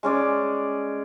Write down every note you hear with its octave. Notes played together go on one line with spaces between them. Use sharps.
G#3 C#4 D5